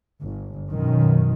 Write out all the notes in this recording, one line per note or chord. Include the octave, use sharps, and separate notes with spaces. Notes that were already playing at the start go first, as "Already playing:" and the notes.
G1
F#2 B2 D#3